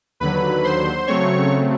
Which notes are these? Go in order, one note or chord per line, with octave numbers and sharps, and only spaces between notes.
D#2 D3 F#3 B4 B5
C5 C6
C#3 F#3 A3 C4 C#5 C#6